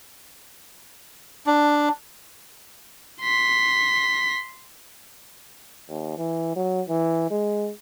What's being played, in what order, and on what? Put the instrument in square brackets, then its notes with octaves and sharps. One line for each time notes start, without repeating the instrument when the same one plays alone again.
[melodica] D4
[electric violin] C6 B6
[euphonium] D#2
E3
F#3
E3
G#3